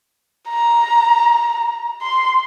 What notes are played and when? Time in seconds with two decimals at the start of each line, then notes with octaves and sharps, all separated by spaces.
0.49 A#5
2.01 C6